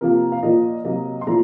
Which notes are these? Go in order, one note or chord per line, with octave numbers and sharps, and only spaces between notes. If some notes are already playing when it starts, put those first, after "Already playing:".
C3 F3 A#3 A#4
F5
A#2 F3 A#3 D#5
C3 F#3 A#3 D#5
C6
A#2 F3 A3 A#5